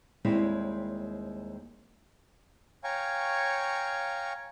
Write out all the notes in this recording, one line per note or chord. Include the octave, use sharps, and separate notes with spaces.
D#2 G3 G#3 C4 E4 C#5
C#5 F5 G5 G#5 A#5 C#6